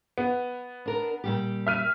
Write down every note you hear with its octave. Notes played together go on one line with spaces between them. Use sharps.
B3
D4 A#4
A#2 G3 G4
E5 F6 D#7